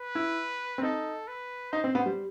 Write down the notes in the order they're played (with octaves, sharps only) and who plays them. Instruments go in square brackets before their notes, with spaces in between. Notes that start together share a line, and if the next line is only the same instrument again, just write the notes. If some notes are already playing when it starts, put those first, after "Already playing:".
Already playing: [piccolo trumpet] B4
[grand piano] E4
C4
[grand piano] D#4 [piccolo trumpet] A4
[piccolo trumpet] B4
[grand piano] D#4 [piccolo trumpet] C5
[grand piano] C4
B3
G3